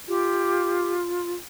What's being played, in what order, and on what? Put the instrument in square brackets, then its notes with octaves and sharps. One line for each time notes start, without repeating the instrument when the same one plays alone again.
[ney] F4 [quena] G4